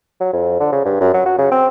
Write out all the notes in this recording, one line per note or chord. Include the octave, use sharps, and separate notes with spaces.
F#3
F2
D3
C#3
G2
F#2
F#3
F#4
C#3
C4